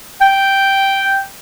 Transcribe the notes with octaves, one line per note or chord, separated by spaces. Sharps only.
G5